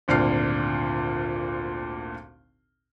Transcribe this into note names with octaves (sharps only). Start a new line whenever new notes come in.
G#1 D2 A#2 D4 F6 C7